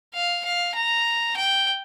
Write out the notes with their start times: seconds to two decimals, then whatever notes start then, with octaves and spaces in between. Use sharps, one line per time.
0.15 F5
0.45 F5
0.75 A#5
1.36 G5